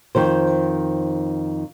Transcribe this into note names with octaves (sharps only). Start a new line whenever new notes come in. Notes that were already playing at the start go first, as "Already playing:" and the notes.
F2 D#3 C5